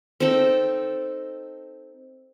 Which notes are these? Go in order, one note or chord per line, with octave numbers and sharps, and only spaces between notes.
C4 D#4 A4 G5